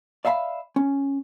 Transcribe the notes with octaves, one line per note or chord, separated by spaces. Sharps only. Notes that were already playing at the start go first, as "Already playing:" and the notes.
D5 E5 F5 A5 B5
C#4